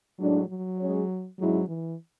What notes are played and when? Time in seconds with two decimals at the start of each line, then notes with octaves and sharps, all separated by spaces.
0.19 A2 F#3 G#3 D4
0.48 F#3
0.79 G#3 C#4 G#4 C#5
1.39 G#2 F#3 G#3 C#4 E4
1.68 E3